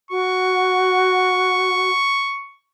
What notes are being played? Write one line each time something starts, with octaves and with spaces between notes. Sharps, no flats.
F#4 C#6